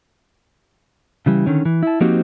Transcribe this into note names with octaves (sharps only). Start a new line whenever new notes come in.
C#3 E3 G3
D3 D#3 C#4
E3
E4 A5
F3 A#3 C4 D#4 F#4 G4